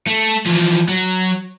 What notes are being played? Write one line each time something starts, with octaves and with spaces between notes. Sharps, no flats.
A3
E3 F3
F#3